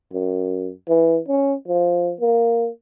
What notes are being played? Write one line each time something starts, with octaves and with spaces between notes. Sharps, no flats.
F#2
E3
C#4
F3
A#3